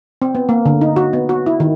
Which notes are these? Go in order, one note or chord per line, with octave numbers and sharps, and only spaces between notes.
C4
B3
A#3
D3
D#4
F#4
B3
F#4
E4
D#3